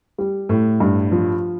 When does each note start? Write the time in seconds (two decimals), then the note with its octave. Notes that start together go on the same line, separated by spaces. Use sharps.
0.18 G3
0.49 A2
0.80 G2
1.12 F3